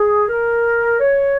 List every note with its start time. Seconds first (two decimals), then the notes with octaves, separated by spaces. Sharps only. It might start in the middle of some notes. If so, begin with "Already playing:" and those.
Already playing: G#4
0.28 A#4
1.00 C#5